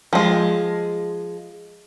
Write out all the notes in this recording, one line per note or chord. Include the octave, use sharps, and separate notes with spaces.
F3 G#3